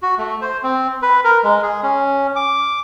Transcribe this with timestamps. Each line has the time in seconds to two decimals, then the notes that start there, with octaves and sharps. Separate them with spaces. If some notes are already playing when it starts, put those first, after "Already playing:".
0.03 F#4
0.18 A3
0.42 C5
0.63 C4
1.02 B4
1.24 A#4
1.43 G#3
1.63 G#4
1.83 C#4
2.36 D6